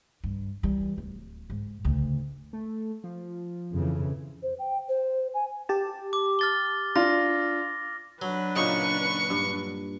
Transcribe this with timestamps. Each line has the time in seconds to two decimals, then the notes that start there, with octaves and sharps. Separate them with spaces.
0.24 G2
0.63 E3 G3
0.98 D1
1.50 G#2
1.84 D2 C#3
2.53 A3
3.04 F3
3.72 F2 C#3 E3
4.43 C5
4.59 G5
4.89 C5
5.34 G#5
5.69 G4 A5
6.13 D6
6.39 F6 A6 G7
6.96 D4 F4 A#6
8.22 F#3 D4 B4
8.56 A#2 C#3 D#4 C#6
9.30 G2